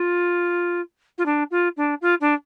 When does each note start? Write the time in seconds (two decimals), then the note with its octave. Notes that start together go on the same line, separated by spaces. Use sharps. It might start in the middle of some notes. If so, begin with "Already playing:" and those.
Already playing: F4
1.18 F4
1.26 D4
1.51 F4
1.77 D4
2.01 F4
2.21 D4